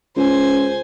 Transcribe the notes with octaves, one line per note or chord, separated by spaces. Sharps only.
C#2 C5 G#5